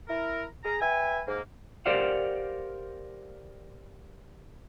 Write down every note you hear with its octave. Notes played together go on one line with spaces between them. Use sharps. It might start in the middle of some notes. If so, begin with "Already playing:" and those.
E4 A#4
G#4 A#5
B4 E5 G5 G#5
G#2 A#3
G4 A#4 C5 D5 F5 F#5